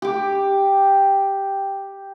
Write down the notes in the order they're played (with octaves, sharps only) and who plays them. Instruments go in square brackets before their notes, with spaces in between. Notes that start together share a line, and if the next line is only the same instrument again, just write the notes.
[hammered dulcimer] G4 D6